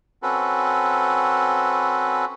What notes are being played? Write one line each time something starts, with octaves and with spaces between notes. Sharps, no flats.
C4 C#4 F#4 A4 B4